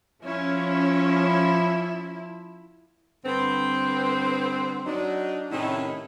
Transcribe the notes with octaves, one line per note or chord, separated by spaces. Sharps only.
F3 C#4 E4
G2 D3 B3 C4
F#3 D4 D#4
A2 C3 D#3 C#4 D#4 E4